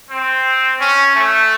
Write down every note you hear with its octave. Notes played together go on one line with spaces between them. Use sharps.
C4
C#4
A3